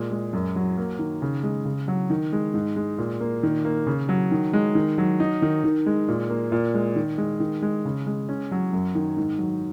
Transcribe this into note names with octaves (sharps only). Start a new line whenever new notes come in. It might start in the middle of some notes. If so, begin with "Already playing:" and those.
Already playing: A#2 G#3
G#3
F#2
F#3
A#3
D#3
C#3
G#3
C#3
F#3
D#3
G#3
G#2
G#3
A#2
A#3
D#3
A#3
C#3
F#3
D#3
G#3
D#3
F#3
D#4
D#3
D#3
G#3
A#2
A#3
A#2
G#3
D#3
G#3
D#3
G#3
C#3
G#3
C#4
F#3
F#2
D#3
G#2
F#3